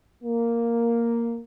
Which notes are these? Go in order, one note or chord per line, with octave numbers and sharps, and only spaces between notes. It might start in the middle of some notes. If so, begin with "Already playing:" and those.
A#3